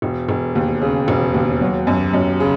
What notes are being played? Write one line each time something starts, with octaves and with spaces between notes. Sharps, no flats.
E1
E1
D#2
C#3
E1
D#2
F#3
F#2
F#2
C#3